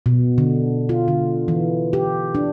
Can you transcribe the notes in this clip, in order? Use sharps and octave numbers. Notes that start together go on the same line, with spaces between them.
B2
D3
F4
D3
E3
G4
D4